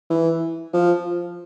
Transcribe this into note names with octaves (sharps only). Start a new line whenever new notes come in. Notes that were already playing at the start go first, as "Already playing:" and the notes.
E3
F3